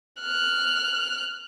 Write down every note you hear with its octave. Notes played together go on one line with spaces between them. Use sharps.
F6 F#6